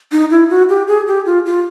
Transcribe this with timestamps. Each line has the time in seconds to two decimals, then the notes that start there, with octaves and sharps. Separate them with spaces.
0.12 D#4
0.31 E4
0.50 F#4
0.69 G4
0.88 G#4
1.08 G4
1.26 F4
1.46 F4